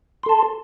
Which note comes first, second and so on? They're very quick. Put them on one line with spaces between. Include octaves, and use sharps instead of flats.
C6 A4 A5